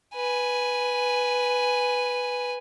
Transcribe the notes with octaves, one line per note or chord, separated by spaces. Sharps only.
B4 G#5